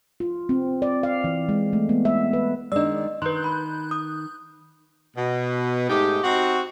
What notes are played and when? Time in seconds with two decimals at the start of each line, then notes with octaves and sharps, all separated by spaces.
0.20 F4
0.49 C4
0.82 D5
1.03 F5
1.24 E3
1.49 G#3
1.73 A3
1.89 B3
2.05 E5
2.33 B4
2.72 D#3 G#3 D4 D5 D#5 E6
3.22 D#3 B4 C6 F#6 G6
3.44 B5
3.91 D#6
5.17 B2
5.89 G#2 A3 D#4 G4
6.23 C4 D#4 F#4